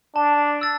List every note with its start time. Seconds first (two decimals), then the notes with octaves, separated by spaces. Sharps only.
0.15 D4 A5
0.61 E6 A6